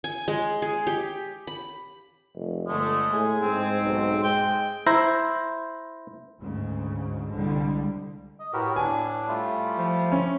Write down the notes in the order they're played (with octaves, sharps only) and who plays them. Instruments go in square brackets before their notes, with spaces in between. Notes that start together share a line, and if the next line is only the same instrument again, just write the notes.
[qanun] G#5
G#3
G#4
G4
B5
[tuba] F1
[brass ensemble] G1 D3 A3 [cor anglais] G#3
[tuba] A2 [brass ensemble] G#4 G#5
[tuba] G#2 [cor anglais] C4
[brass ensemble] B1
[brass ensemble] G#3 [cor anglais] G5
[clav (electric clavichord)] E4 C5 A#5
[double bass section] D2 G#2 C#3
C2 D3 G3 G#3
[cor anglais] D#5
[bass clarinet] A2 [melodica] F#4 G4 A#4 [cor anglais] B4
[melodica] B3 [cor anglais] D4 [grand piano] G#5
[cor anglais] G3 [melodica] A3 F4
[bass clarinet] F3
[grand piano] C#4